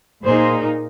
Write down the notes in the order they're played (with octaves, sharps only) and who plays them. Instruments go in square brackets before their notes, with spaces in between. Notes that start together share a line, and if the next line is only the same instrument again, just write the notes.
[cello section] A#2 A#3 D#4 G#4 C5